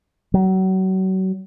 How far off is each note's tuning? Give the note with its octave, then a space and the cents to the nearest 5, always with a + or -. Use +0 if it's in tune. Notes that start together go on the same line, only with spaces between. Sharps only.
F#3 +30